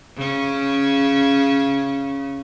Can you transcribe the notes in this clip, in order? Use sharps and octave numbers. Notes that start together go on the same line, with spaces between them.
C#3 C#4